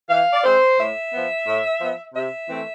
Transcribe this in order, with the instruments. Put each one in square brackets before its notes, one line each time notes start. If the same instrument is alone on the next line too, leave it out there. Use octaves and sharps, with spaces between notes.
[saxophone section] E3 F5
D5
G#3 C4 C5
A2 E5
F3 B3
A2
F3 B3
C3 E5
E3 A3 C4